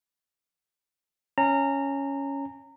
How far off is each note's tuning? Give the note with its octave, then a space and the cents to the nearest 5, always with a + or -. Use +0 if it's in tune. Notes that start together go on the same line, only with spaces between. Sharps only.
C#4 +0 A#5 -25